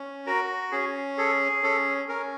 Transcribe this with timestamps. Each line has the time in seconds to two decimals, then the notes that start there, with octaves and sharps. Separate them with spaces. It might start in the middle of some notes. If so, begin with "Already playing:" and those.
Already playing: C#4
0.27 F#4 A#4
0.72 C#4 G#4
1.18 G#4 A4
1.63 C#4 A4
2.08 C#4 A#4